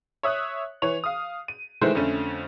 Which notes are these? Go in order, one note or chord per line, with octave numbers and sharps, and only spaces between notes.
C#5 E5 D#6 F#6
E3 C#5 F7
F5 D#6
D#7
D#3 E3 G#3 A3 E4 C5
F2 D3 A3 C#4